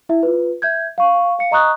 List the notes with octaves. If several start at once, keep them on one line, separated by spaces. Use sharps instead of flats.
E4 E5
F4 B4
E5 G6 G#6
F5 C#6
F5 C#7
D#5 A#5 C#6 D#6 F#6